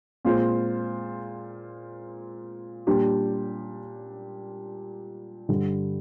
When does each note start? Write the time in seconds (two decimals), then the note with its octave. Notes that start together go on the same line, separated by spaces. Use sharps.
0.25 A#2 G#3 C4 F4 C5
2.87 A#2 G3 D4 G4
5.49 G2 D3 G3